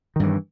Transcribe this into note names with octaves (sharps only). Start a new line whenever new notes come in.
G2 D#3 E3